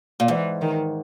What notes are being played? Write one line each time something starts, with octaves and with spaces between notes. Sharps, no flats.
A#2
G#2 E3
D#3